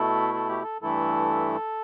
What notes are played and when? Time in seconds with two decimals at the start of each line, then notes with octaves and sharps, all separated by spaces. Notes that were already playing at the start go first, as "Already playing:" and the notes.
Already playing: B2 A3 E4 A4
0.34 A4
0.49 G4
0.62 A4
0.81 G2 E3 A3 E4 A4